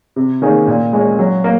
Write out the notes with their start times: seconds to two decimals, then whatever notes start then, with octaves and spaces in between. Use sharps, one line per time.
0.16 C3
0.42 D#3 A#3 C#4 G#4
0.67 A#2
0.93 G#3 C#4
1.19 F#3
1.44 A#3